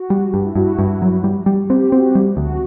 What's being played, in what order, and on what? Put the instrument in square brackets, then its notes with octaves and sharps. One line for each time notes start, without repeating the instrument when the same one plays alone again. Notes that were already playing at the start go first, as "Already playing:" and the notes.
Already playing: [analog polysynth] F#4
[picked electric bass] G3
[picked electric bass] G2 [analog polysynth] G4
[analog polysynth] E4
[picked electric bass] G2 [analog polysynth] F#4
[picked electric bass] G2 [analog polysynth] E4
[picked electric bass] F#3
G3
G3
[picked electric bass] C4 [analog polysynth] G4
[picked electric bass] C4 [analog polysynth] F#4
[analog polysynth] G4
[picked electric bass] G3 [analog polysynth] G4
[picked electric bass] D2 [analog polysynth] F#4